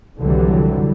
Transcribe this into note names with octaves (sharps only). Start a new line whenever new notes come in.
C2 F2 D3 E3 F#3 G3